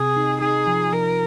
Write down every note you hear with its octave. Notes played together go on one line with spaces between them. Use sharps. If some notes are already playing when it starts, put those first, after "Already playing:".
Already playing: C3 G#4
D#4
D#4 G#4
F3
F3 A#4